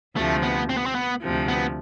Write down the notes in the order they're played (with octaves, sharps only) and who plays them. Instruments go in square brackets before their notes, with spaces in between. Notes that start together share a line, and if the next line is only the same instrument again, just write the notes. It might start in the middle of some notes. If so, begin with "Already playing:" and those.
[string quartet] D2 C3 F3 [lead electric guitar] A3
[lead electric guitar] B3
C4
B3
C4
B3
[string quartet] D2 C3 F3
[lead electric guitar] B3